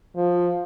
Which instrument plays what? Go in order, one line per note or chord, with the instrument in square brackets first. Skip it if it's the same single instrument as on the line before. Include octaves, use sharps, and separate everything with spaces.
[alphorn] F3